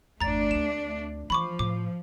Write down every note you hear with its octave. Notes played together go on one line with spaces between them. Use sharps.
G1 E2 A3 D4 A#5 A6
D2 C4 E7
E3 F3 B5 C#6 D6
A2 D6